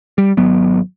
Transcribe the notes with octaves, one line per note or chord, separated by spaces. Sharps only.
G3
G#1 F#3 B3